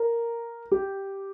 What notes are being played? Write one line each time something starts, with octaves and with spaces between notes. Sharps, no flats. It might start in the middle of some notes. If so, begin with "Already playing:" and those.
Already playing: A#4
G4